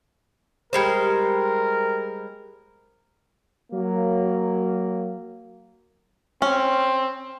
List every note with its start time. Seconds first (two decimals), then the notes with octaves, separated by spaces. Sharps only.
0.73 G3 G#3 A#4 C5
3.73 F#3 A#3
6.42 C4 C#4